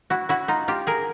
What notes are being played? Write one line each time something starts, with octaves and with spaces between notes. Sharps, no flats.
E4 F#4
E4 F#4
D#4 F4
F4 G4
G#4 A#4